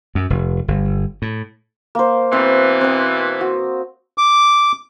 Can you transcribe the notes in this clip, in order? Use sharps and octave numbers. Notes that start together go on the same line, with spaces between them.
F#2
F1
G1
A2
A#3 C5
B2 E3 C4
C4 D#6
F#4
D6